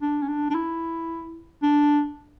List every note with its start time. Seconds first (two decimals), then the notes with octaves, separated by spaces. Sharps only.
0.02 D4
0.22 C#4
0.28 D4
0.50 D4
0.55 E4
1.63 D4